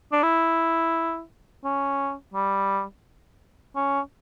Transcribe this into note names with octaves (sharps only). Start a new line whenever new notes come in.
D4
E4
C#4
G3
C#4